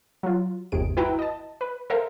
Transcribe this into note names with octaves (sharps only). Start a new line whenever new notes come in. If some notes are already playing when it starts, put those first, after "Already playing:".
F#3 F4
G1 D#2 C3 G#4 D7
E4 F#4 B4 E5 G5 A#5
D#5 A5
B4
A4 A#4 C5 E5 F5